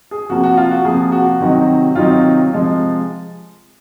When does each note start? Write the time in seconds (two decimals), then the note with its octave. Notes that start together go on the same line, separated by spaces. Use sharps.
0.11 G#4
0.29 C3 F3 A#3 F#4
0.43 F#4
0.57 F4
0.71 F#4
0.85 C3 F3 A#3 G#4
1.12 F#4
1.40 C3 D#3 F#3 C4 D#4
1.95 C3 D#3 F#3 C4 D#4 F4
2.51 C3 F3 G#3